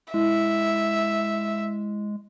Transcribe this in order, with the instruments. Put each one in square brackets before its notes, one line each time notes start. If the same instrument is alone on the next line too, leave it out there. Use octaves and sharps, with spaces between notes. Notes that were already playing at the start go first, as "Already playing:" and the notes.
[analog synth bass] G#3 [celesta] E4 [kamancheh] E5